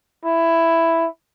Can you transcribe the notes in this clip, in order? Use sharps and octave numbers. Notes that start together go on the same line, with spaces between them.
E4